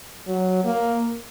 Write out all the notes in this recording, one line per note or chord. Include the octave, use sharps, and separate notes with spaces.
F#3
A#3